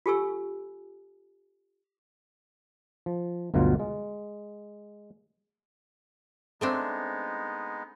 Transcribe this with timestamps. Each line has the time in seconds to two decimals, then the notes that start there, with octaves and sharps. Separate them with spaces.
0.06 F4 G4 A4 G#5 C#6 E6
3.06 F3
3.54 G1 D2 B2 F#3 F4 F5
3.80 G#3
6.61 G#3 A3 B3 C4 D4 D#4